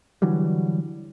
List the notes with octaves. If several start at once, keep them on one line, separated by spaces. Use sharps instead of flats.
D3 E3 F#3 G3